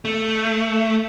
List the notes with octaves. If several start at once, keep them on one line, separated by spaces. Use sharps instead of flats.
A3